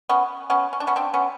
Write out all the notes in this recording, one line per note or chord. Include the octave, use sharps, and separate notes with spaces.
B3 C#4
B3 C#4
C#4
D4
B3 C#4
C4 D4
B3 C#4